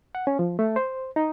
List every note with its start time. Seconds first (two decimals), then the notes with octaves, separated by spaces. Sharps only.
0.15 F#5
0.27 C#4
0.39 F3
0.59 A3
0.76 C5
1.16 D#4